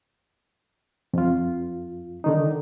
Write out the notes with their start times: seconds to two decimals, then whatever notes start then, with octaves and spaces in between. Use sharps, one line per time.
1.13 F2 F4
2.24 D3 D#3 D#4